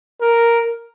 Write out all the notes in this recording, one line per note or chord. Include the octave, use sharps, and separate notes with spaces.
A#4